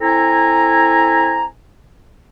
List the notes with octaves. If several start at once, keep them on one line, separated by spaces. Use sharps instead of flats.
C4 E4 A4 G#5 A#5